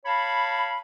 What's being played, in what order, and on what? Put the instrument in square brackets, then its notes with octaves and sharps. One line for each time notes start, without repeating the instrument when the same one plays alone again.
[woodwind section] C#5 F5 A5 B5